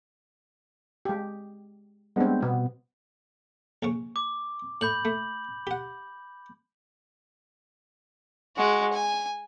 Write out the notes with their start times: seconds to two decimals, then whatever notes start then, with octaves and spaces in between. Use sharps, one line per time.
1.05 G#3 G4
2.16 G3 G#3 B3 C4 D4
2.42 B2 B3
3.83 A#1 C#3 C#6
4.16 D6
4.81 A2 B5 G6 F#7
5.05 A3
5.67 G4 F#5
8.56 G#3 F#4
8.93 G#5